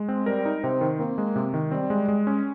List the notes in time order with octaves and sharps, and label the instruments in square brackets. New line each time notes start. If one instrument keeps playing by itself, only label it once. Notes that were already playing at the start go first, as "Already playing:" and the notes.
Already playing: [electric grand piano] G#3
C4
[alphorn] G3 [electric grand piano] A#4
[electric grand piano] D#4
[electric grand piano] C3 [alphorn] C4
[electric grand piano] D#3
[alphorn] A#3 [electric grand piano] C4
[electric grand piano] G#3
C3
D#3
[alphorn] G3 [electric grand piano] C4
[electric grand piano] G#3
G#3
C#4